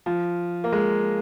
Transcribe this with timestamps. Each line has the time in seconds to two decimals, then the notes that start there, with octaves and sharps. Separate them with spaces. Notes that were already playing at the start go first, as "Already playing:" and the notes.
0.06 F3
0.64 A#3
0.72 G#3